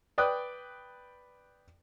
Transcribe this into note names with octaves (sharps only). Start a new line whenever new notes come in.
B4 D5 G5 D#6 F#6